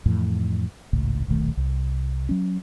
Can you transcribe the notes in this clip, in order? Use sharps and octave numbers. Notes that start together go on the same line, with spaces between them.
F2 A2 E3
G#1 C#2 A2
D#1 B1 D#3 A3
C2
F#3 C#4